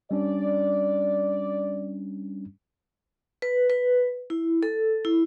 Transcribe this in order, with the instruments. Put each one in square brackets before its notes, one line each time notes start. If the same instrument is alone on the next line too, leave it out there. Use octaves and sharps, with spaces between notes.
[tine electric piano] G3 C#4 D4 [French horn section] D5
[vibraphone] B4
B4
E4
A4
E4